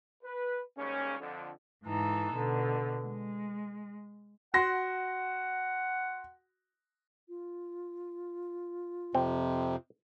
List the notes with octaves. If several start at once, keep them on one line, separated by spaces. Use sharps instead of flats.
B4
G#2 C#3 G3 A#3 C#4
F2 D3
G#2 E3 D#4 A4
B2 D3
G#3
F#4 F#5 C6 A#6
F4
F2 C3 C4